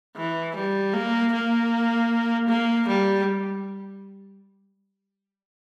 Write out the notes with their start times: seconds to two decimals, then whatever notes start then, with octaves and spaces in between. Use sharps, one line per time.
0.16 E3
0.56 G3
0.94 A#3
1.33 A#3
2.48 A#3
2.87 G3